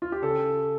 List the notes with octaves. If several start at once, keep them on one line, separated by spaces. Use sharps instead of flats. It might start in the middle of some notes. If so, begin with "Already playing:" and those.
F4
G4
C#3 A4